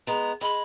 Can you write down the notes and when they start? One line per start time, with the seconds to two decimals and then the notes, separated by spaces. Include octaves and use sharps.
0.07 G#3 B3 A#5
0.41 G#3 B5